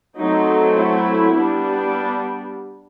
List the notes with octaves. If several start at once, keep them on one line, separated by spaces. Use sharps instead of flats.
F#3 A3 C4 D#4
E4
G3 B3 D4